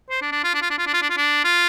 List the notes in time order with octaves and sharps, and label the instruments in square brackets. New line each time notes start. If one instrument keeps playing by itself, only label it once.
[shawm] C5
D4
D4
F4
D4
F4
D4
F4
D4
F4
D4
F4
D4
F4